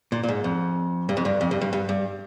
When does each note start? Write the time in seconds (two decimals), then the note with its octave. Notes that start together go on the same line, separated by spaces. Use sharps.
0.12 A#2
0.24 A#2
0.28 G#2
0.44 F2
1.09 G2
1.17 F2
1.25 G2
1.41 F2
1.51 G2
1.61 G2
1.73 G2
1.89 G2